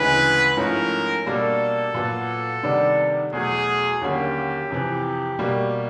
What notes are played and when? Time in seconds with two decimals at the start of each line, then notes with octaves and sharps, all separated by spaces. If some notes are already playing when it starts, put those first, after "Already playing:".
Already playing: D2 C#3 E3 G#3 B4
0.57 G#2 F3 A3 C#4 E4 A#4
1.26 B2 G3 A#3 D4 A4
1.94 A#2 F#3 B3
2.63 C3 D#3 G3 B3 D4
3.32 E2 B2 F#3 A3 G#4
4.01 D#2 D3 F#3 A#3 C#4 G4
4.70 F2 C3 E3
5.39 B2 G3 A#3